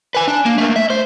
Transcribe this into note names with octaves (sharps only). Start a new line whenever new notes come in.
B4 G#5
D4
A#3
A3 A#3
E5
C5